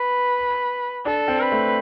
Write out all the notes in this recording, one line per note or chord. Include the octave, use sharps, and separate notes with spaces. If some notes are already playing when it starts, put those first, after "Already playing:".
Already playing: B4
D4 A4
C4
B4
A3